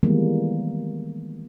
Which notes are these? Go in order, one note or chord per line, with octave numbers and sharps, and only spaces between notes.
D#3 E3 G3 G#3 A#3 B3